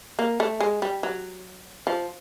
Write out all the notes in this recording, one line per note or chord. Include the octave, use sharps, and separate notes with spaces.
A#3
A3
G#3
G3
F#3
F3